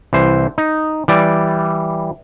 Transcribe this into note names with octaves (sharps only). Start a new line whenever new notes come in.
C2 E3 C5
D#4
E3 G3 D5